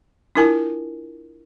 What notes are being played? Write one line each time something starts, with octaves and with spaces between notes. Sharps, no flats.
D4 E4 F4 A#4 G#5 A5